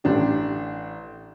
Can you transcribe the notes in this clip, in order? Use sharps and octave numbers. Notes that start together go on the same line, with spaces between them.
A1 D4 G4